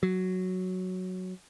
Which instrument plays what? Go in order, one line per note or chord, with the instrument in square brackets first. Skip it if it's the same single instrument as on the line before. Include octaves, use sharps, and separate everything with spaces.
[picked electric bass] F#3